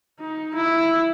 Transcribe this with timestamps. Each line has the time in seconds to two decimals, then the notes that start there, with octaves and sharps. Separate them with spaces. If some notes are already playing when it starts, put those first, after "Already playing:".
0.20 D#4
0.55 E4